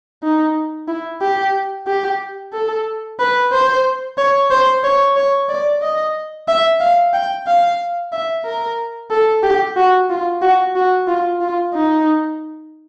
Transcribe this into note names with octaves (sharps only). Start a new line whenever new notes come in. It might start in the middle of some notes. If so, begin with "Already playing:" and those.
D#4
E4
G4
G4
A4
B4
C5
C#5
C5
C#5
C#5
D5
D#5
E5
F5
G5
F5
E5
A#4
A4
G4
F#4
F4
F#4
F#4
F4
F4
D#4